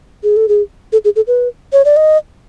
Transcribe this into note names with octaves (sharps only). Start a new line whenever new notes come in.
G#4
A4
G#4
A4
G#4
A4
B4
C#5
D5
D#5